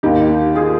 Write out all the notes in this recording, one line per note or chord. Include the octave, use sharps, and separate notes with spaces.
D#2 D#3 D#4 G4
F4 G#4